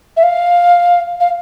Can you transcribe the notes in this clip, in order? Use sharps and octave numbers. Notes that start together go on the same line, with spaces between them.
E5
F5
F5